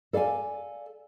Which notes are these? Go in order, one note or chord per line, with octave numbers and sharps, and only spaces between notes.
A4 D5 F5 F#5 G#5